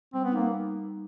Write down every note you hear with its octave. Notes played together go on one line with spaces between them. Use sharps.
G3 C4
B3
A#3 D#4